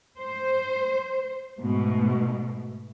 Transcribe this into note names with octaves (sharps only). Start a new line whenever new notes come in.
C5
G#2 B2 A3